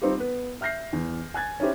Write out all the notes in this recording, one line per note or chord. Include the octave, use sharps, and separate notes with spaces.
G3 C4 D#4 F4 G4
B3 B4
E5 F6 G6 A#6 C7
E2
G#5 F#6 G#6 A6
C#4 D#4 E4 G4 C5